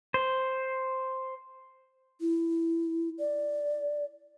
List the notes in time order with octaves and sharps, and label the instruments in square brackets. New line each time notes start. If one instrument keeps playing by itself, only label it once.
[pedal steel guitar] C5
[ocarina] E4
D5